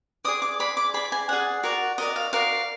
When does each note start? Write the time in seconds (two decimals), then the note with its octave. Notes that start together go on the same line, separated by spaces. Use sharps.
0.25 G#4 D5 D#6
0.42 D6
0.59 G#4 D5 B5
0.77 D6
0.94 G#4 D5 B5
1.12 G#5
1.29 G#4 D5 F#5
1.63 F#4 A#4 D5
1.98 F#4 A#4 D5 D#5
2.16 F5
2.33 F#4 A#4 D5 F5